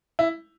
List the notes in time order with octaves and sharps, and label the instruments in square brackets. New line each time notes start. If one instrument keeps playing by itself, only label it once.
[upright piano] E4